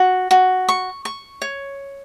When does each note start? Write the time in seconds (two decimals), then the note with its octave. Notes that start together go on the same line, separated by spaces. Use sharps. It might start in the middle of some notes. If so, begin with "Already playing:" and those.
Already playing: F#4
0.31 F#4
0.69 C#6
1.05 C#6
1.42 C#5